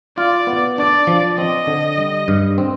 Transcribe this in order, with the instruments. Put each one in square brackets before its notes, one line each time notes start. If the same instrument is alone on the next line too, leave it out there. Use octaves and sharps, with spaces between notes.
[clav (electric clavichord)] F4 [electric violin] D5
[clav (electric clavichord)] B3
[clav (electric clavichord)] D4 [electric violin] D5
[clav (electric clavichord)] F3
[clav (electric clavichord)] C4 [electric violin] D#5
[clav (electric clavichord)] D3
G3
G2
C4